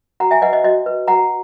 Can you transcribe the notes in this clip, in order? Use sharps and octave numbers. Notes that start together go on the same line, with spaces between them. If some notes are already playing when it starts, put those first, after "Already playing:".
F#4 F#5 A#5
E5 G#5
B4 D#5 F#5
D#5
F#4 D#5
B4
F#4 F#5 A#5